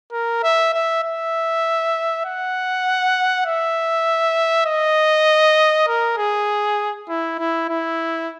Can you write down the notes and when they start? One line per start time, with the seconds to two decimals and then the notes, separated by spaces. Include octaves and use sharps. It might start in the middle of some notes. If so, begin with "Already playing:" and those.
0.12 A#4
0.43 E5
0.73 E5
1.03 E5
2.25 F#5
3.45 E5
4.66 D#5
5.88 A#4
6.17 G#4
7.09 E4
7.38 E4
7.69 E4